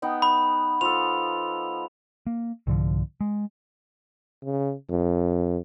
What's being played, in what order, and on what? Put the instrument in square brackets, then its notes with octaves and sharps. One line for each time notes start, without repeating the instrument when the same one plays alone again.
[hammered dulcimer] B3 D#4 G5
[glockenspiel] B5
[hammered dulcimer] F3 A4 [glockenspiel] F7
[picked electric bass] A#3
C2 G#2 D3 F3
G#3
[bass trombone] C#3
F2